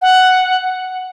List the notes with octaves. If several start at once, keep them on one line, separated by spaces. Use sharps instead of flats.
F#5